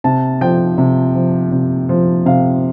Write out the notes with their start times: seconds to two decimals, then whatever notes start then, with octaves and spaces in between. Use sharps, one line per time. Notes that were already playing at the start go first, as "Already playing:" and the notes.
0.04 C3 A5
0.41 F3 G5
0.78 C3
1.15 F3
1.52 C3
1.89 F3
2.26 C3 F5